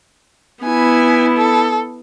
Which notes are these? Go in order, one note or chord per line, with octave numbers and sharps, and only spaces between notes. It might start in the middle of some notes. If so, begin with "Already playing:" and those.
B3 E4 G#5
A4